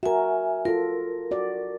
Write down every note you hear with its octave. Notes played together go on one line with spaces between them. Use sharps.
F#4 A#4 E5 G#5
F4 A4 A#4
F#4 D5